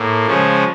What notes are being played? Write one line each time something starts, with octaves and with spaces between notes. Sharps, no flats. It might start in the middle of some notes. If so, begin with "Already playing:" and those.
Already playing: A2 A#3
C#3 F3 G#3 C#4